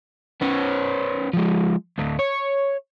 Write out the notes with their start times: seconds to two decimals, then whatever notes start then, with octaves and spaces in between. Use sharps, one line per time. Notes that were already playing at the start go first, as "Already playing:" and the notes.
0.42 B3 C#4
1.33 F3 G#3
1.98 D2 A2
2.19 C#5